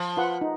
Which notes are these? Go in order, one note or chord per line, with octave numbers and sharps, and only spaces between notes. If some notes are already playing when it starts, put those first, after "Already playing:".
Already playing: F3
F4 B4 F#5
D#4